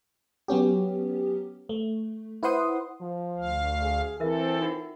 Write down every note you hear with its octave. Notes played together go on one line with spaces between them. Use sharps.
F#3 B3 C#4 G4
A3
E4 B4 C5 F#5 C6 D#6
F3
D2 F5
G#4
E3 C4 A4 A#4 E5
D#4 F4 F#5